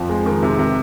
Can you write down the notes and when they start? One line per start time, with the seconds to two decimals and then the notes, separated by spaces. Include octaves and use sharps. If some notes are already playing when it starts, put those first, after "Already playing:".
Already playing: F2 F3
0.09 G#3
0.26 D#3
0.43 C3
0.59 C3